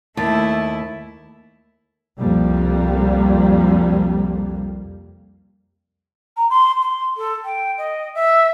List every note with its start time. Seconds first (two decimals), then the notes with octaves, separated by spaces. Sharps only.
0.17 D#2 A3 E4 A5
2.20 C2 F2 G3 A#3
6.37 A#5
6.50 C6
6.82 C6
7.17 A4
7.44 G5
7.78 D#5
8.15 E5